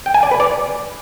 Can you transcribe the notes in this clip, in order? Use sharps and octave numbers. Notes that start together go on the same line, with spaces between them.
G5
G#5
D5
B4
D5